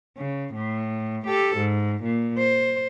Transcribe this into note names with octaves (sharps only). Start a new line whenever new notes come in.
C#3
A2
G4 A4
G#2
A#2
C5